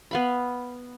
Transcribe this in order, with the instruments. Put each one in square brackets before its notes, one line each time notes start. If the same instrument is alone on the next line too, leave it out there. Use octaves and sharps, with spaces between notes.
[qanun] B3 F5 B5